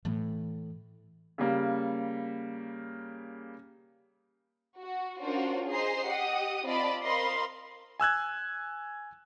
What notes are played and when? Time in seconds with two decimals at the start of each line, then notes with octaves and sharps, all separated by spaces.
0.05 A2 E3
1.38 C#3 G3 A#3
4.80 F#4
5.21 C#4 D4 F4 F#4 A#4 C5
5.69 G#4 C5 D#5 A#5 C7
6.07 G4 D#5 F#5 D#6
6.65 C4 F4 D5 D#5 A5 B5
7.04 A#4 C5 D#5 F5 B5 C6
8.00 G#5 E6 F#6 G#6